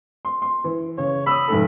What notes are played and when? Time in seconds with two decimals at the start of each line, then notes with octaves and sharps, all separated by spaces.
0.25 C6
0.42 C6
0.64 E3
0.98 C#3 C#5
1.27 B5 D#6 E6
1.48 F1 G#2 A4